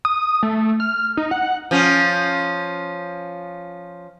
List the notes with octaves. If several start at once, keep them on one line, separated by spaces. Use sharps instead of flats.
D#6
A3
F6
D#4
F#5
F3 C#4